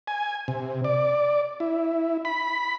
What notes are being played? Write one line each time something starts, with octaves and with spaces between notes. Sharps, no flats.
G#5
C3
D5
E4
B5